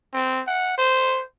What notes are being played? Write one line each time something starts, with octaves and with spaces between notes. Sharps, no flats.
C4
F#5
C5